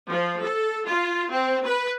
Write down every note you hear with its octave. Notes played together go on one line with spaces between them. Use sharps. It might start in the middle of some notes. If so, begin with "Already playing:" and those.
F3
A4
F4
C4
B4